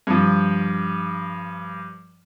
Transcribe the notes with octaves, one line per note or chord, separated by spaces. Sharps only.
G2 F3